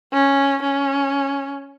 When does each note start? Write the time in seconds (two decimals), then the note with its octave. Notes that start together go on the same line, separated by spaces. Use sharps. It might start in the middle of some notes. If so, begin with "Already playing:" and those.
0.13 C#4
0.62 C#4